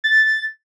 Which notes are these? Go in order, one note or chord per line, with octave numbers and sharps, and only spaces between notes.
A6